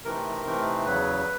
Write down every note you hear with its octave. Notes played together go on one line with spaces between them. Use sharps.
C3 E3 A3 C4 D#4 A#4
C3 E3 A3 C4 D#4
E2 C#3 F#3 B4